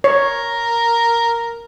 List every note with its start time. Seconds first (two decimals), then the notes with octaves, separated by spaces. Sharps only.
0.04 A#4 C#5